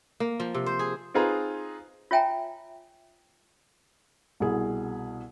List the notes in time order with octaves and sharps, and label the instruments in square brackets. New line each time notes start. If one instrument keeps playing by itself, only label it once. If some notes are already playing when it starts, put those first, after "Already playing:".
[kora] A#3
F3
C3
C5
G#4
[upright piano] C4 D#4 F4 G#4 B4 A#5
[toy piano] F4 C#5 E5 G5 G#5 A#5
[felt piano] C2 B2 E4 G#4